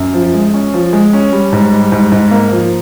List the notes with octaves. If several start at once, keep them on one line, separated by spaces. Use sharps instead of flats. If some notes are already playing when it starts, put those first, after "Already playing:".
Already playing: F#2
F3
G#3
C#4
F3
G#3
C#4
G3
G#2
G3
G#2
G#2
A#3
F3